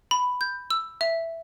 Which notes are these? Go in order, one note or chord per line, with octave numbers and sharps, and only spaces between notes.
B5
G6
E6
E5